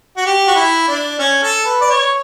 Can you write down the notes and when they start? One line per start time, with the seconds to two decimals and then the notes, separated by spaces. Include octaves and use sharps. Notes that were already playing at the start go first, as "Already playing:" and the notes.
0.17 F#4
0.26 G4
0.48 F#4
0.56 E4
0.88 D4
1.19 C#4
1.43 A4
1.65 B4
1.81 D5
1.89 C#5